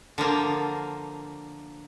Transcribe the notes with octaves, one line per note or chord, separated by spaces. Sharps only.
D3 F3 A#3 F4